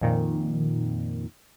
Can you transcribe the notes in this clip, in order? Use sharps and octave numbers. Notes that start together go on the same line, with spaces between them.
F2 A#2 D#3